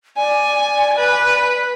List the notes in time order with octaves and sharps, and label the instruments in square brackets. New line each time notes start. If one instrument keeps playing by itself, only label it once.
[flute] D5 [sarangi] G#5
[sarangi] B4